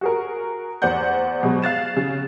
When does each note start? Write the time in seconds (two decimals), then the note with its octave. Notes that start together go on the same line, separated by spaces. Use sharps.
0.01 F#4 G#4 A#4
0.82 E2 C5 D5 F#5 G6
1.43 B2 F#3 G#3
1.62 F5 F#6 A6 E7
1.96 C#3